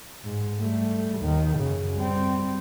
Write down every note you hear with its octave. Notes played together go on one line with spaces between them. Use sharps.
G#2
G3 A3
D#2 D#3
F#2 C#3
G3 C4